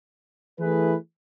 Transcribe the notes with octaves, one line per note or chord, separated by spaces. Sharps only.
E3 A3 E4 G#4 B4